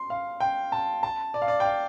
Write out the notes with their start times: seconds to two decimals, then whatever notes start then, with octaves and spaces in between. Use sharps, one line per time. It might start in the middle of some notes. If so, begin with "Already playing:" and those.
Already playing: C6
0.10 F5
0.40 G5
0.72 A5
1.03 A5
1.34 D5
1.42 F5
1.48 D5
1.60 G5
1.65 F5